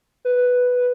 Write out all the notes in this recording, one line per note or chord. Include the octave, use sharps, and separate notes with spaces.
B4